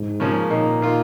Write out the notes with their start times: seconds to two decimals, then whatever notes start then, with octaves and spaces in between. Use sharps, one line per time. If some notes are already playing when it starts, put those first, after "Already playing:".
Already playing: G#2
0.20 C#3 F3 A#3 C#4
0.50 A#2 D#3 A#3 D#4
0.81 D#3 A#3 F4